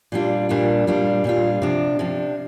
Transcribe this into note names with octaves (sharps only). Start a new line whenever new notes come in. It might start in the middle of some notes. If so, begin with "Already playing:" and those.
A#2 G3 D4 F4
A#2 G3 D4 F4
A#2 G3 D4 F4
A#2 G3 D4 F4
C3 F3 D4
C3 F3 D4